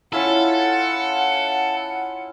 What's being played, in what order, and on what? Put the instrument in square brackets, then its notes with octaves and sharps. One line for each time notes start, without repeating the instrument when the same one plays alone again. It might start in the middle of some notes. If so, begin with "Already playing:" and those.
[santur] C#4 E4 F4 [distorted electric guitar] A4 [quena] F#5